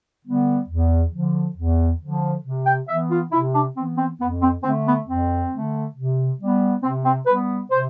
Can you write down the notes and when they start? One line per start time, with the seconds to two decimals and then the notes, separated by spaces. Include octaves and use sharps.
0.24 D3 G3 B3
0.68 E2
1.13 D3 F3
1.57 E2
2.00 D3 F3
2.44 C3
2.66 G5
2.88 E3 B3 E5
3.10 F4
3.32 C3 E4
3.54 D4
3.75 B3 C4
3.79 E3
3.97 C4
4.20 F2 B3
4.41 C4
4.63 D3 A3 C4
4.86 B3
5.07 F2 C4
5.51 D3 A3
5.96 C3
6.39 G3
6.44 B3
6.83 C3 C4
7.05 C4
7.27 G3 B3 B4
7.71 C3 C5